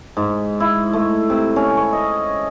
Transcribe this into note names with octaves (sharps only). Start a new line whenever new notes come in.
G#2
E4
A3
C3
C#4
C#5
D#5